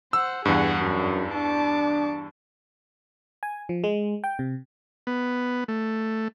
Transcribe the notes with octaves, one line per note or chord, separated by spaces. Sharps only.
C5 F#5 E6
E2 G2 G#4 F#5
F#2 D4
D4 A5 D6
G#5
F3
G#3
G5
C3
B3
A3